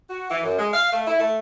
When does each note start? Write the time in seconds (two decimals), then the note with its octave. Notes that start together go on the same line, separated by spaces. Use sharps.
0.09 F#4
0.29 E3
0.42 F#2
0.57 G#3
0.72 F5
0.91 A3
1.07 E4
1.19 A3